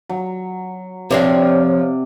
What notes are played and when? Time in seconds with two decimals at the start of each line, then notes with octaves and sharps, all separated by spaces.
0.09 F#3
1.11 C3 F3 C4 D4 C#5 D5 D6